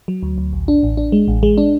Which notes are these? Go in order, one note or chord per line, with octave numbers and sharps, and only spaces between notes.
F#3
D2
D2
A1
D4
A1
D4
G#3
A1
G#3
D4